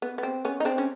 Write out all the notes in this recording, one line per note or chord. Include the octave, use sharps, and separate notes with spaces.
B3
B3
C4
B3 C#4
D#4
C4 D4
C#4